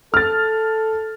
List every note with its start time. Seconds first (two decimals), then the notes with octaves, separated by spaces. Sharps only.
0.14 A4 F6 A6